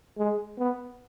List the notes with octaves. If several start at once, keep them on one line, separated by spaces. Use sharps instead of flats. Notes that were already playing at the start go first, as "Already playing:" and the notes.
G#3
B3